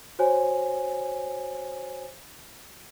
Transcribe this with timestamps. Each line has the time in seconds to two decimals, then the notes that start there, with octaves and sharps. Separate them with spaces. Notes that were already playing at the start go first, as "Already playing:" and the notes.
0.19 F#4 C5 C#5 G#5